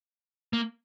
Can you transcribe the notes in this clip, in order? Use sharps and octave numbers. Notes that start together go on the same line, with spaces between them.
A#3